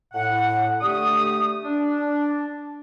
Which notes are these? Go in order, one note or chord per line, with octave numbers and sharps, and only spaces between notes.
A2 F#5
D3 A3 G4 D#6
D4